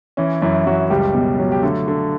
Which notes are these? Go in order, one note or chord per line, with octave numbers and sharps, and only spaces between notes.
E3 C#4
F#2 E3 E4
F#2 F#3 F#4
C#2 G3 G4
B2
F#3
G4
D3 A3 A4
D3